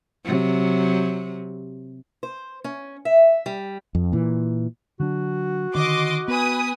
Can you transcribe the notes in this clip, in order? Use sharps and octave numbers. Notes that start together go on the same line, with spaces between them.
C3 F#3
C5
C#4
E5
G3
F2
A#2 E3
D3 F#3 D4 F#4
D3 D#3 D#5 C6 D6
B3 B4 G#5 D#6